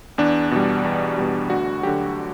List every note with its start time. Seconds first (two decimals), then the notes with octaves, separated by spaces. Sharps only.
0.18 E2 D4
0.51 B2 G3
0.84 E2
1.18 B2 G3
1.50 D2 F#4
1.83 D3 F#3 G4